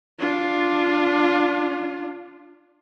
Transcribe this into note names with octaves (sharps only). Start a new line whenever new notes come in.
D4 F4